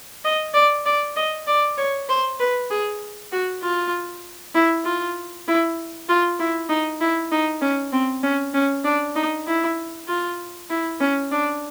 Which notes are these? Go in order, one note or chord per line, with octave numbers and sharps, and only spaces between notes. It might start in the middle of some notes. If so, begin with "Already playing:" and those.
D#5
D5
D5
D#5
D5
C#5
C5
B4
G#4
F#4
F4
E4
F4
E4
F4
E4
D#4
E4
D#4
C#4
C4
C#4
C#4
D4
D#4
E4
F4
E4
C#4
D4